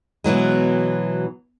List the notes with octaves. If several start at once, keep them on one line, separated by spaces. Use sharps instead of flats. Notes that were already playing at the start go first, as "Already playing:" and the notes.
B2 E3 F#3 G#3